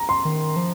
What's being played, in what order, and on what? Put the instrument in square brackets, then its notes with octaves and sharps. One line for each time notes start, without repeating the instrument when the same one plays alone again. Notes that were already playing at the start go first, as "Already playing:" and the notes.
Already playing: [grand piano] A#5
C6
[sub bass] D#3
F3